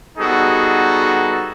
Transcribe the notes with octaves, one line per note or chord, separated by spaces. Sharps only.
G3 B3 D#4 F#4 G#4 A4